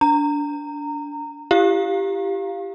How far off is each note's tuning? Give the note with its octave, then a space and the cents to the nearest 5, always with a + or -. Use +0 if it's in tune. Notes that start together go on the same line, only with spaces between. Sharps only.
D4 -20 A#5 -20
E4 +45 G4 +0 F5 +0